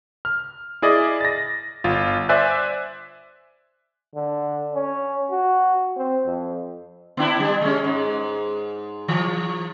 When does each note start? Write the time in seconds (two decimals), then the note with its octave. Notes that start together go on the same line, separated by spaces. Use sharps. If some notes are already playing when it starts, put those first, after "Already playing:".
0.25 F6
0.82 E4 G#4 D5 D#5
1.21 A6 A#6
1.84 G1 F4
2.29 C5 D5 E5 G#5 F#6
4.15 D3
4.74 C#4
5.31 F#4
5.96 C4
6.26 F2
7.17 B3 D4 E4
7.40 G3
7.61 G#3 C#4
7.84 G#2
9.08 E3